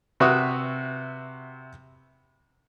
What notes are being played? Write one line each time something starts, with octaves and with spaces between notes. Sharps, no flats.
C3 F#4 B4 E5 C#6 D#6